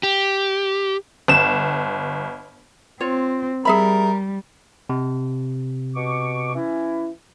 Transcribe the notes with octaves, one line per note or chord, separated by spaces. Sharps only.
G4
G1 E7
C4 F4 C#5
G3 G#4 A#4 E5 B5
C3
B2 C#6 D6
E3 C#4 E4